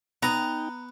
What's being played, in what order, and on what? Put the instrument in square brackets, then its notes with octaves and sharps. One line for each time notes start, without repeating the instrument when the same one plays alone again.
[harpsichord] B3 D#6 [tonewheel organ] D#4 G5 [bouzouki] A#5